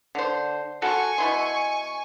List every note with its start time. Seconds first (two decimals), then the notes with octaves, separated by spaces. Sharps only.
0.15 D3 C5
0.82 F#4 A4 G#5 C#6
1.18 B2 E4 C6